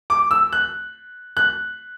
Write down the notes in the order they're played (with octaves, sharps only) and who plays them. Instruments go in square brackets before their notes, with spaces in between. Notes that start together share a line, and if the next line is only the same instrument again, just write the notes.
[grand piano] D6
E6
F#6
F#6